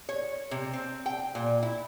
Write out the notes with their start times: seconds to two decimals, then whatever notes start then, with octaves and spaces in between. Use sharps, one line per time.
0.09 C#5
0.51 C3
0.73 C4
1.06 G5
1.35 A#2
1.63 E4